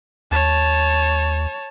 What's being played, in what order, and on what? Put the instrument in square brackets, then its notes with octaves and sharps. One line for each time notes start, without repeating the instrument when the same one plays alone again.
[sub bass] D#2 [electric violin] C#5 A5